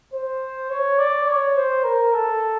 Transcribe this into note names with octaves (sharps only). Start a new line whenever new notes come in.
C5
C#5
D5
C#5
C5
A#4
A4